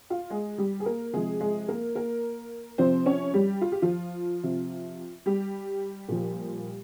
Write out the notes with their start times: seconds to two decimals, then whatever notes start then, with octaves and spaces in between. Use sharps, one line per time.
0.10 F4 F5
0.30 G#3 G#4
0.58 G3 G4
0.80 G#4
0.86 A#3 A#4
1.13 C3 F3 G#3 G#4
1.40 G#3 G#4
1.68 A#3 A#4
1.95 A#3 A#4
2.78 C3 F3 C4 C5
3.06 C#4 C#5
3.34 G3 G4
3.61 F4
3.72 G4
3.82 F3 F4
4.43 C3 F3
5.26 G3 G4
6.08 A#2 F3